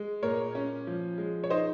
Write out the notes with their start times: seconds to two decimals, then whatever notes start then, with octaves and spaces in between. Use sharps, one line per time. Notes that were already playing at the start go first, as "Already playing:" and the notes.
Already playing: G#3
0.23 A#2 A#4 C#5
0.55 C#4
0.87 F3
1.18 G#3
1.44 C#5
1.50 D#4 C5 D#5